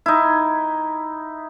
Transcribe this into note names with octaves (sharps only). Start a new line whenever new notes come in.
D#4 E4